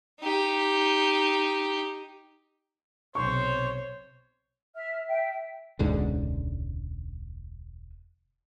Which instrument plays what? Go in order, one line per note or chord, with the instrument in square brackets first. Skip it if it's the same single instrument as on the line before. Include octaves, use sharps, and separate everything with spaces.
[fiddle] D#4 G4
[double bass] B1 C3 [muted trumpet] C5 [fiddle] C#5 [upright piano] C#6
[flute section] E5 F6
E5 G5
[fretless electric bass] E1 C#2 G#2 D3